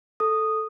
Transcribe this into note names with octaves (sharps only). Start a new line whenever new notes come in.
A4 D#6